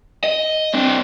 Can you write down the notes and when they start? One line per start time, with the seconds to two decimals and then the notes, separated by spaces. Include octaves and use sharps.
0.24 D#5
0.74 C4 D4